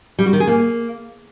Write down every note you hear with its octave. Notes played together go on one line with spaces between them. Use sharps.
G3
F#4
D#3
G#4
A#3